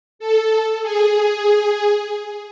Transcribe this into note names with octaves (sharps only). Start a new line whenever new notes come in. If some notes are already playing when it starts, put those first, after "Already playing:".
A4
G#4